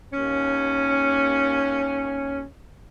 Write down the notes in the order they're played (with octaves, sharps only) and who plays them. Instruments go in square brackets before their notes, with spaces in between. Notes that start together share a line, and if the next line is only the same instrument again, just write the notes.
[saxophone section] D#2 C#4